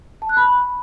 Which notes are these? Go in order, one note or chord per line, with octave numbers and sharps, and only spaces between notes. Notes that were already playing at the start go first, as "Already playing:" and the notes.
A5
F#6
B5